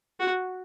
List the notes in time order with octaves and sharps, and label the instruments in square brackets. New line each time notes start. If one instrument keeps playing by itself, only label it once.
[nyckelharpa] F#4